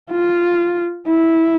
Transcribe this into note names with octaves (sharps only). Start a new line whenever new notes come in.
F4
E4